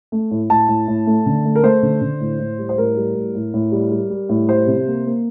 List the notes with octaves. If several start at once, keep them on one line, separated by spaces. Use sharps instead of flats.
A3
A2
A2 A5
A2
A2
A3
D3
A3
A#4
A3 C5
D3
D3
A2
A2
G3
C5
A2 A#4
G3
A2
A2
A2
G3
G3
G3
A2
G3 C5
C3
A#3
A#3